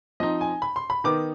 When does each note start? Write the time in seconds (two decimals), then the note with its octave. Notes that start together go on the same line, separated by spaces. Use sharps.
0.20 F3 C4 D#4 D#5
0.41 G#5
0.62 B5
0.76 C6
0.90 B5
1.04 D#3 B3 D#4 D6